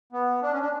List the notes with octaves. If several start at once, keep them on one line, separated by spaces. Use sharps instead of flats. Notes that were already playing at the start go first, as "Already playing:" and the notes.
B3
D4
C#4
D4